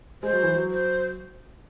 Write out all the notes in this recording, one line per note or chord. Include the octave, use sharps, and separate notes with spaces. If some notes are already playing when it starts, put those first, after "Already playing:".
G#3 C5
F#3
E3
F#3
C5